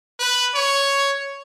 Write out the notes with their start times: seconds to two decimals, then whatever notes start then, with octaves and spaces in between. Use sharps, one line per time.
0.20 B4
0.55 C#5